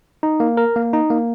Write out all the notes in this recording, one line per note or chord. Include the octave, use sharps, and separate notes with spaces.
D#4
A#3
A#4
A#3
D#4
A#3